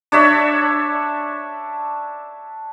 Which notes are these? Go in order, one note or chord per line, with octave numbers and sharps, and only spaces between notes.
D4 C#5 E5 B5